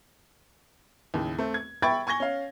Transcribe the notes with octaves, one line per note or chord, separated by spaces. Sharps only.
D#2 A2 C#3
A3 C4
G#6
E5 G5 B5 C#6 G#6 A6
G#5 C#6 G#6 A#6 G7
C#4 F5